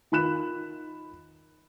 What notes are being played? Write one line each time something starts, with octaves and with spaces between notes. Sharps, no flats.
D#3 F4 B5 F#6 E7